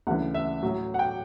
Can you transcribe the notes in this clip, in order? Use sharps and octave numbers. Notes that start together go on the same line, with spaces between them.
D2 C#3 E3 F#5
E5
A2 F#3
F#5
G5